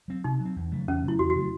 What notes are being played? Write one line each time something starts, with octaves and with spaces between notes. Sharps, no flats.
F#3 C4
C3 D#4
F#3
C4
E2
C#3 F#3 A3
E2 C#4
C#3 F#3 A3 E4
E2 F#4
F#4
C#3 F#3 A3